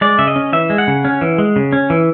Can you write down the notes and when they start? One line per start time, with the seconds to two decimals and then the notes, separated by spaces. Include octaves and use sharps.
0.01 G#3 D5
0.19 C#3 E5
0.27 D#5
0.36 C#4
0.53 E3 E5
0.70 G#3
0.78 F#5
0.87 C#3
1.05 C#4
1.21 E3
1.38 G#3
1.56 C#3
1.73 C#4
1.90 E3